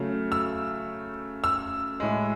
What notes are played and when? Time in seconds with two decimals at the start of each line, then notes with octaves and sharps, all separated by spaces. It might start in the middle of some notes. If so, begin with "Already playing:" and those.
Already playing: C#3 F#3 A3
0.32 E6
1.44 E6
2.00 A2 G#3